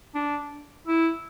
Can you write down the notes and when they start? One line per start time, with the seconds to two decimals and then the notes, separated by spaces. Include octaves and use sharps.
0.15 D4
0.87 E4